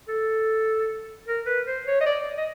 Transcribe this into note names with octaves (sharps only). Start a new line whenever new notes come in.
A4
A#4
B4
C5
C#5
D#5
D5
D#5